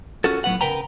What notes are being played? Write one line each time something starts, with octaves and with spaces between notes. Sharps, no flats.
C#4 F4 F#4 A4
A2 F#3 B3 F#5
C#3 A#4 B4 G5 A#5